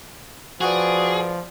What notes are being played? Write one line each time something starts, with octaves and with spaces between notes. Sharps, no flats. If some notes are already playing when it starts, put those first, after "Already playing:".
F3 F#4 G#4 B4 D5